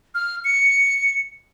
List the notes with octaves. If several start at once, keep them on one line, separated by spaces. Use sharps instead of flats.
F6
C#7